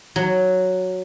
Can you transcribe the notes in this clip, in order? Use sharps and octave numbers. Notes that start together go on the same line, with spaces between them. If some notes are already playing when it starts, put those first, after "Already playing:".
F#3